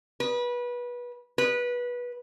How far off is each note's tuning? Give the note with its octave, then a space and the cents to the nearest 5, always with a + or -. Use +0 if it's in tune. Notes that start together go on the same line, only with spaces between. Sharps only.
B4 -25
B4 -20